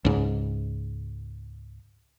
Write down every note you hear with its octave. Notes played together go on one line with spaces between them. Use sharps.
C#2 G#2